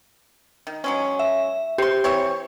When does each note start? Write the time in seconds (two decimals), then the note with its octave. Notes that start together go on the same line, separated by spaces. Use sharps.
0.67 D#3
0.84 F#3 G#3 C#4
1.19 E5
1.78 G4 C5 C6
2.04 E3 C4 C#5